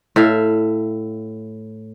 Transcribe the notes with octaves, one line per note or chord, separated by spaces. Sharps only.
A2 E5 F5